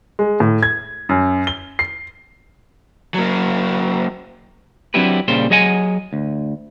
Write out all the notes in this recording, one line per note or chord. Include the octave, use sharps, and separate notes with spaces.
G#3
A2
G#6
F#2
G7
C7
F#3 A#3
F#3 C4 D4 E4 G4 B4
A#2 C#3 G3 C5
F#3 G#4 D#5 F#5 G#5
D2